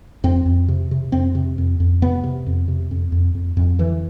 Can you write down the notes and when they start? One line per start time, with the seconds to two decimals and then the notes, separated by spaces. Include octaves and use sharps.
0.24 F2 C4
0.46 F2
0.68 C3
0.91 C3
1.12 F2 C4
1.35 C3
1.58 F2
1.80 F2
2.02 C3 B3
2.24 C3
2.46 F2
2.68 C3
2.91 F2
3.12 F2
3.35 F2
3.57 F2
3.79 D3 E3